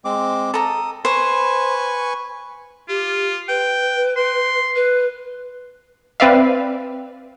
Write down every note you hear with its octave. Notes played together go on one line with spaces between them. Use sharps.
G#3 C4 D6
A4 A#5 D#6
B4 C5 G#5 C#6
F4 G4
B4 G5
C6
B4
C4 B4 D5 E5 F5